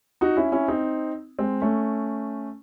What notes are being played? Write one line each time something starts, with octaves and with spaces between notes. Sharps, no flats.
D#4 F#4
C#4 E4
C#4 E4
C4 D#4
G#3 C4
A3 C#4